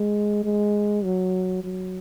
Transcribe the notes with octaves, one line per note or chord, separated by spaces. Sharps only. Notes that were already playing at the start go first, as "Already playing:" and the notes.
Already playing: G#3
G#3
F#3
F#3